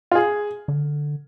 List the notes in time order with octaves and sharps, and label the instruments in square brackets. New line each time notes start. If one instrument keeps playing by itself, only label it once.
[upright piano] F4
G#4
[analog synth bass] D3